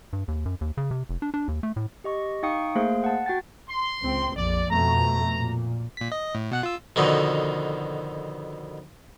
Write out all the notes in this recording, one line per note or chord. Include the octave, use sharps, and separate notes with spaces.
G2
D#2
F#2
D#2
C#3
C3
F1
D4
D4
D#2
A3
A2
G4 D#5 C#6
D#4 F5 G5 C#6 D#6 C#7
A3 A#3 G#4 C5 F5
F#5 A5
F#4 G5 A6
C6
C#2 C4
A#1 F2 D5
F2 B2 A3 A#5
A#2
A#2 B6
D#5
A2
B2 F#5 F#6
F4 E6
F2 B2 D3 D#3